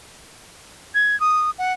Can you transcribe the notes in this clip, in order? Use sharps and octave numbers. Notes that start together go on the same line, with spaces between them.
G#6
D#6
F#5